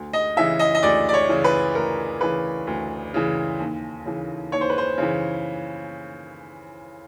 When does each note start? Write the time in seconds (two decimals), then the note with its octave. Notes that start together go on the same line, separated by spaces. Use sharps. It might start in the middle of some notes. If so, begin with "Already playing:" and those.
Already playing: D2
0.13 D#5
0.37 C#3 E3 E5
0.59 D#5
0.75 D#5
0.83 D2 D5
1.09 D5
1.14 C#5
1.29 C#3 E3
1.44 B4
1.75 D2 A#4
2.21 C#3 E3 B4
2.67 D2
3.14 C#3 E3
3.60 D#2
4.06 C#3 E3
4.52 D#2 C#5
4.61 C5
4.70 B4
4.78 C5
4.98 C#3 E3